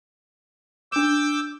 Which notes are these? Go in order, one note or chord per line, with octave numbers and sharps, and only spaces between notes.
D4 D6 E6 G6 E7